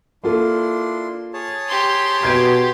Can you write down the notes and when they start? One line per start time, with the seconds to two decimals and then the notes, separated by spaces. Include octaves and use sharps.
0.24 A#3 D4 E4 F4 A4 C6
1.33 G#4 C#5 A5
1.69 G4 C6
2.23 B2 G6 G#6 D7